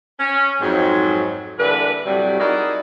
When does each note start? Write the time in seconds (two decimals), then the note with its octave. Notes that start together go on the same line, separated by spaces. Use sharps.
0.20 C#4
0.61 F2 G#2 F#3
1.59 D3 E3 G3 A#3 B4
2.05 A2 C3 F#3 G3
2.40 D#4 E4 F#4 G#4 A#4 D5